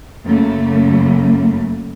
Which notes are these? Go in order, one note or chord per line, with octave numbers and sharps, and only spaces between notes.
F#2 C#3 A3 A#3